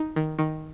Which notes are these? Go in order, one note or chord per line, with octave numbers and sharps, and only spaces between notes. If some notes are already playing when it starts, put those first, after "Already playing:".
Already playing: D#4
D#3
D#3